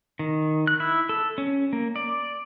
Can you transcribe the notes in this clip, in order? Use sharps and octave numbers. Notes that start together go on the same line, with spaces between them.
D#3
F#6
E4
A4
C#4
A#3
D5